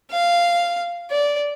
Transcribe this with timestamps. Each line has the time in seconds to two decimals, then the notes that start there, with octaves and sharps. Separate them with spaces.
0.11 F5
1.11 D5